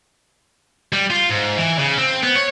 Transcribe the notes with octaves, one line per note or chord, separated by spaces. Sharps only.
G3
F4
G#2
E3
C#3
C4
B3
C#5